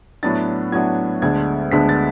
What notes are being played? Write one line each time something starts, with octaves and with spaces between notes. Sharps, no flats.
A2 F#3 B3 D4 A6
A2 F#3 B3 D4 G#6
D2 D3 G#3 B3 D4 G#6
D2 D3 G#3 B3 D4 B6
A6